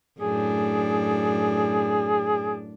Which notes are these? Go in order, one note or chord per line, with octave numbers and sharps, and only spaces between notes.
F#2 A2 D4 G#4